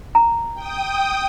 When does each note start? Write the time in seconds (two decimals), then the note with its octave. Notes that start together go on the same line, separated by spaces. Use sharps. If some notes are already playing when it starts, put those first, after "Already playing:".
0.15 A#5
0.54 G5 D#6